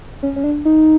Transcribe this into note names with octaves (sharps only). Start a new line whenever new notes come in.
C#4
C#4
D4
D#4